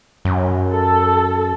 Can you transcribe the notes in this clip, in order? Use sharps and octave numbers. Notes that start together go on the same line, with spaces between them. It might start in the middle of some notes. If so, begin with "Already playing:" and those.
F#2
A4